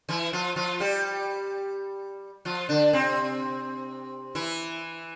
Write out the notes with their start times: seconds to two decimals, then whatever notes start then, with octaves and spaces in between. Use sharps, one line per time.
0.09 E3 E4
0.33 F3 F4
0.56 F3 F4
0.80 G3 G4
2.45 F3 F4
2.69 D3 D4
2.93 C3 C4
4.35 E3 E4